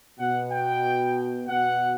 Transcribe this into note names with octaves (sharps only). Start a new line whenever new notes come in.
B2 F#5
G5
B2 F#5